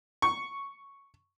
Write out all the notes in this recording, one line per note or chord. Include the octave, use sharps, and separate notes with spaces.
C#6